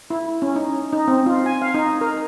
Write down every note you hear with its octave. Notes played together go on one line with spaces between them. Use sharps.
E4
C#4
D#4
D#4
C4
F4
G#5
F5
D#4
A#4